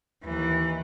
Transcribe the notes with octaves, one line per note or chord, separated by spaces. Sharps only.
D#2 E3